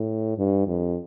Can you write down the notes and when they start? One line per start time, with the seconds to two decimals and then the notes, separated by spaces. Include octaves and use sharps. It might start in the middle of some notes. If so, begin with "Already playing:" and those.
Already playing: A2
0.38 G2
0.67 F2